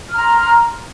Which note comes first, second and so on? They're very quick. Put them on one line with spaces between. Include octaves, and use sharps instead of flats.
F6 A#5 C6